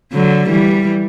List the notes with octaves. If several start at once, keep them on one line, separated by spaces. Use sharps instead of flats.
D3 F#3
E3 G3